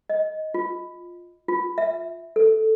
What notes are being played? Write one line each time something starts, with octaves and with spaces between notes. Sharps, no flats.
D#5
F4
F4
E5
A4